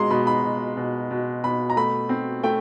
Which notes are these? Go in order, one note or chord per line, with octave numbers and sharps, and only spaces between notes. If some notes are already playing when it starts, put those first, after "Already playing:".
Already playing: B2 G#3 A#5 C6
B2 B5
B5
B2
B2
B2
B2 B5
A#5
A3 B5
C4
A3 G5